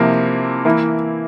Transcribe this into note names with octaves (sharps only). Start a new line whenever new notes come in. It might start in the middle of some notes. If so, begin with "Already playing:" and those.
Already playing: C3 F3 A#3 E4
E3 A#3 E4